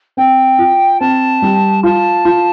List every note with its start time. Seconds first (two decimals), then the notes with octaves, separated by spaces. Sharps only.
0.17 C4 G5
0.58 F4
1.00 C4 A5
1.42 G3
1.83 F4 A5
2.25 F4